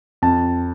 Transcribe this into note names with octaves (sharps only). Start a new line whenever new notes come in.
F2 A5